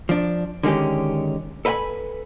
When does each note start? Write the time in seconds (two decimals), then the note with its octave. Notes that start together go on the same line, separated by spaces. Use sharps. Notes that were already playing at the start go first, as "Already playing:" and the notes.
0.09 F3 D4
0.63 D3 D#3 G#3 C#4 G4
1.65 A4 B4 D#5 F5 G#5 B5